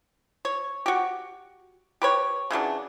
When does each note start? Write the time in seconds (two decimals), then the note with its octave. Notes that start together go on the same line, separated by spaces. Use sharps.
0.45 C#5
0.86 F#4 G4
2.02 G4 B4 C#5
2.51 C#3 E3 F#3 D4